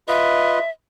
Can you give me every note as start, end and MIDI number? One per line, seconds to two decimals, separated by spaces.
0.08 0.59 65
0.08 0.59 71
0.08 0.59 75
0.08 0.70 76